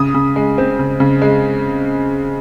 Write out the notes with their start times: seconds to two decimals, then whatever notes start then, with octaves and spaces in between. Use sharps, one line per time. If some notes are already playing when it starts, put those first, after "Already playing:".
Already playing: C#3 D#6
0.14 C#3
0.36 G#3
0.58 C4
0.79 C#3
1.00 C#3
1.22 G#3